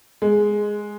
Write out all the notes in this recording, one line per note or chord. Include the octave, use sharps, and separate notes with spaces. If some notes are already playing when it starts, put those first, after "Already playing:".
G#3